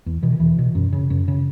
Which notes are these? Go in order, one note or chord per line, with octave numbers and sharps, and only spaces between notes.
E2
B2 E3
D#3
E2 E3
B2
F#2
C#3
F#2
C#3